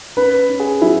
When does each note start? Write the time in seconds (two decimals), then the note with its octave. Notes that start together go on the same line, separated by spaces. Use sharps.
0.17 C#4 B4
0.49 C#4
0.60 G#4
0.81 F#3 E4